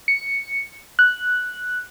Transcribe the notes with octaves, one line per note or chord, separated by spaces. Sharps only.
C#7
F#6